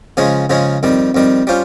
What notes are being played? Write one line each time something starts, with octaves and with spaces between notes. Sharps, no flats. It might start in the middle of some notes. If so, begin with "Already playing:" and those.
C#3 F3 G#3 C#4 G#4
C#3 F3 G#3 C#4 G#4
F2 D#3 G3
F2 D#3 G3
G3 C#4 F4 C5